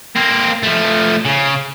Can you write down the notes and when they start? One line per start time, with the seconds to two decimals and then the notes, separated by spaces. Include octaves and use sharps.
0.16 A#3 C4
0.63 F3 A3
1.26 C#3